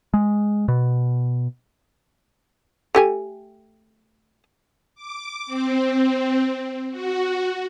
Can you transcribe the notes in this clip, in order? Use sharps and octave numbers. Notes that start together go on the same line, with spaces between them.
G#3
B2
A3 G4 G#5
D6
C4
F#4